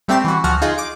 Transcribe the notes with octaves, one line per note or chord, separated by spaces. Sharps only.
G3 A3 C4 G4 C7 E7
E3 F#4
D2 F3 F#4 F#5 F6
D#4 F4 G#4
D6 D7